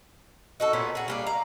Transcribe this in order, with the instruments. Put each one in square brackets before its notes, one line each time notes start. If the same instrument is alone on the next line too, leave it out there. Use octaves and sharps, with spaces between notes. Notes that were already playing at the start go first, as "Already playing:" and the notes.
[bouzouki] D#4 F#4 A4
A#2 B3 C#4
F#4 G#4
G3 A#3 D4
F5 A#5